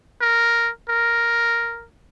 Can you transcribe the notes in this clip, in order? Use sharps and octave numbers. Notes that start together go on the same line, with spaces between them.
A#4
A#4